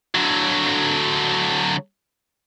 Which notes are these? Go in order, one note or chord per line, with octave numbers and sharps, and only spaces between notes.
D3 F#3